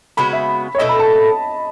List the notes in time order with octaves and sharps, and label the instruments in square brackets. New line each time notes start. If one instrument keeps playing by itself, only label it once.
[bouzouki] C#3 G#3 B3 F#4 [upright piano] B5
[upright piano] E5
C#5
[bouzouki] B2 A3 E4 A4 [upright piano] D#5
[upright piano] B5
A5